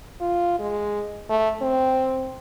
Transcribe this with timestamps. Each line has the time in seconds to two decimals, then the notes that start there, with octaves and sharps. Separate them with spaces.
0.21 F4
0.59 G#3
1.30 A3
1.62 C4